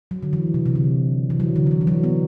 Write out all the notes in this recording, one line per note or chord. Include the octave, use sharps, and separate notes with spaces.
F#3
D3
E3
C3
C3
D3
E3
F#3
D3
D3
E3
E3
F#3
B3